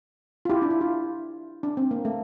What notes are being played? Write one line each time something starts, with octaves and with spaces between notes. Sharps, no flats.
F4
E4 G4
D4
E4
F4
D4
C4
A#3
A3